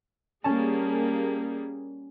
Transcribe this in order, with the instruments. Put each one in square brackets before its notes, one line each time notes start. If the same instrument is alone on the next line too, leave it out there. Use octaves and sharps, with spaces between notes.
[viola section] G3 A#3 G#4 [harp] C#4 A5